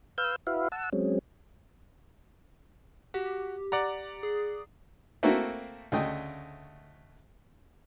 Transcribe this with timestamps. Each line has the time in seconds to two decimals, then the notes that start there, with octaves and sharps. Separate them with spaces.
0.18 B4 F5 E6 G6
0.47 E4 F#4 B4 E5 F5
0.72 F#5 A5 E6
0.93 F#3 G#3 C4 C#4
3.14 F#4 G4
3.72 D5 F#5 A#5
4.23 G#4
5.23 A3 A#3 C4 E4 F#4 A#4
5.92 D2 C#3 A3 D#5 G5